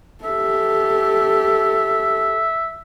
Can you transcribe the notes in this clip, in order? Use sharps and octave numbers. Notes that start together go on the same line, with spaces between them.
G4 A4 E5